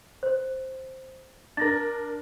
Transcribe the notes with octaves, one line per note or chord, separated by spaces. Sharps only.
C5
D4 A#4 A6 A#6